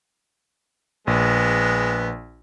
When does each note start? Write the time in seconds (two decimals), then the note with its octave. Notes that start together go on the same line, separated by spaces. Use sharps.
1.07 A#1 G#3 B3